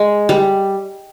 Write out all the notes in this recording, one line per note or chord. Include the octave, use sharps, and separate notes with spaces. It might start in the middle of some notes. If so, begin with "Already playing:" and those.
Already playing: G#3
G3